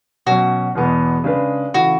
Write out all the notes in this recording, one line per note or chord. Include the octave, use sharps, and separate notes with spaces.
B2 F#3 C#4 F#4
E2 B2 G#3 B3
C#3 G#3 D4 G#4 B4
C#3 E3 A3 E4 F#4 A4